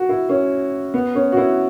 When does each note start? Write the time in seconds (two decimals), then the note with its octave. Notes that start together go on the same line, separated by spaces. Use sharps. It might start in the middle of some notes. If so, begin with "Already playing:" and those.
Already playing: F#4
0.09 E4
0.29 C#4
0.94 B3
1.15 C#4
1.32 F#4
1.37 E4